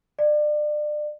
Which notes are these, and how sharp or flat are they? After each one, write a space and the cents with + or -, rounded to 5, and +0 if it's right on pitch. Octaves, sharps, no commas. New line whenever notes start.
D5 +30